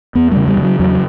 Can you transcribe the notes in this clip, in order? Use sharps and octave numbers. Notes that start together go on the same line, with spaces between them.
E2 B3
C#3 G3
G3
C#3
F#3
E2 F#3